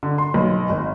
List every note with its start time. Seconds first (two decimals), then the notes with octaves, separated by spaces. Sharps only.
0.03 D3
0.18 C6
0.34 B1
0.69 G#1